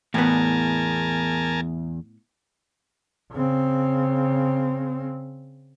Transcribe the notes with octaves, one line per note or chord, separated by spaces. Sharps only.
E2 A2 B3 A#4 G#5 A5
C#3 C4